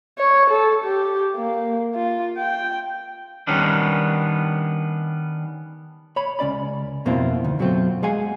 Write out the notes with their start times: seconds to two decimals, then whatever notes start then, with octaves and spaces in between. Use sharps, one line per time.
0.18 C#5
0.50 A4
0.84 G4
1.36 A#3
1.95 F4
2.38 G5
3.47 D#3 G3 B3 C#4 D4
6.16 C#5 B5
6.39 C#2 C#4 D5 B5
7.05 F2 B2 A#3 C4 E4 F4
7.44 D2 D#3
7.59 F#2 B2 F#3 A3 C4 F4
8.03 G#3 G#4 F5 F#5 G#5